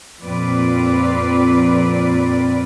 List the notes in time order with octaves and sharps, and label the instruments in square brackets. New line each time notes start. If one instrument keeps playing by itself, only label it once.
[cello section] F2 A#2 C4 F4 B4 D5